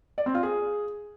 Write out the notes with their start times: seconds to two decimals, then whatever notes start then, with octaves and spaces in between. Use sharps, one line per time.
0.18 D5
0.26 C4
0.35 F4
0.43 G#4